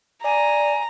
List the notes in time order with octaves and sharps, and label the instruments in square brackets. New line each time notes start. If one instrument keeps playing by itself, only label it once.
[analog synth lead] D5 [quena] G#5 [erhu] A#5